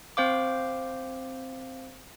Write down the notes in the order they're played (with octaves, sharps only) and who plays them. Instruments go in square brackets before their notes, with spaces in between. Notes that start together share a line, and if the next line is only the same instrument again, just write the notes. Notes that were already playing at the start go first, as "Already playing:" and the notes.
[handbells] C4 C5 F5 D6